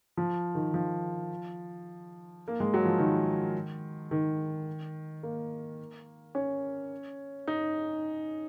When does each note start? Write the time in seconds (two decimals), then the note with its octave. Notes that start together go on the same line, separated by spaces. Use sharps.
0.17 F3
0.55 D#3
0.74 F3
2.48 A#3
2.60 G#3
2.74 F#3
2.85 F3
2.99 D#3
4.11 D#3
5.23 A#3
6.35 C#4
7.47 D#4